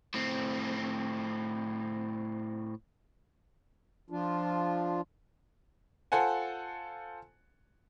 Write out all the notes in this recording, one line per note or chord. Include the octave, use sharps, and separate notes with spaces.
A2 C4
F3 D4 F4
F4 A4 C5 F#5 G#5